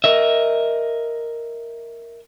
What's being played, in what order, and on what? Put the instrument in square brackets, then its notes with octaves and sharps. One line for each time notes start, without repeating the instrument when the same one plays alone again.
[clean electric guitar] A#4 D#5 E5